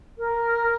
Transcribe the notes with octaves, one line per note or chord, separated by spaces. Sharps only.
A#4